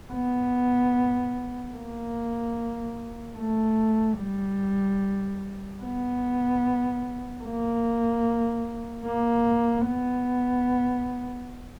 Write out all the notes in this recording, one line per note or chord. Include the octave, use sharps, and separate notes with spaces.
B3
A#3
A3
G3
B3
A#3
A#3
B3